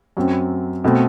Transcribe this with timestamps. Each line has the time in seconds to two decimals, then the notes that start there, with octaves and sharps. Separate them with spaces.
0.17 F#2 F#3 C4
0.84 B2 A3 C4